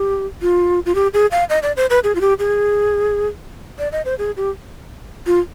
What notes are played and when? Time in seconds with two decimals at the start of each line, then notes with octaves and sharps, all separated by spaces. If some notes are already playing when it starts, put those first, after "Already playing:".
Already playing: G4
0.42 F4
0.86 F4
0.95 G4
1.14 G#4
1.32 F5
1.50 D#5
1.63 D5
1.77 C5
1.90 B4
2.04 G#4
2.15 F4
2.21 G4
2.39 G#4
3.79 D5
3.92 D#5
4.05 C5
4.19 G#4
4.37 G4
5.26 F4